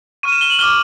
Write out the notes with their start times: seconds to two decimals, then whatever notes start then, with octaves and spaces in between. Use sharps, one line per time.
0.23 C#6 F6 D#7
0.32 E7
0.41 G7
0.50 F#7
0.59 D6 F6 G7